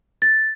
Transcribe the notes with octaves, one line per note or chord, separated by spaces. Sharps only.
A6